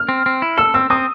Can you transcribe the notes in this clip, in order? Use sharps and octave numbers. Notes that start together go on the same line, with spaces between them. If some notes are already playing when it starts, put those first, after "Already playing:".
Already playing: F6
C4
C4
E4
A4 E6
C4 E6
C4 D#6